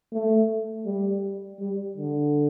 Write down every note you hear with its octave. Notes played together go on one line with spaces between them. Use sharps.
A3
G3
G3
D3